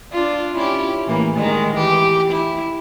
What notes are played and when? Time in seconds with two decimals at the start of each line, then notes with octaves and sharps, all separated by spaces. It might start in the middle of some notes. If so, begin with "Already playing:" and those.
0.11 D4 F4
0.57 C#4 E4 G4
1.07 A2 E3 A#3
1.36 D#3 G#3
1.76 E3 G4
2.30 E4